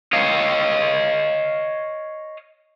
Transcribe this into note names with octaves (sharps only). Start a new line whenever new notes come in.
C#5 D#5 F5